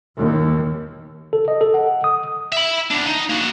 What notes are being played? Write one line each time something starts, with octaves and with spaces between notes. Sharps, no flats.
D#2
A4
D#5
A4
F#5
D#6
E5 B5
E2 D4
D#4
A#3 F#4